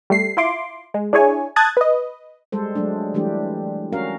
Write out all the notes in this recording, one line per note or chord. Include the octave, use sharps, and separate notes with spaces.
G3 A3 C7
E4 F4 C6 D6
G#3
D4 E4 G#4 C#5 G#5
A5 D#6 F#6 G#6 A6
B4 D#5
G3 G#3 A4 C5
F#3 G#3 A3 D4
E3 G3 A3 D4 G4
C#4 F#4 A#4 F5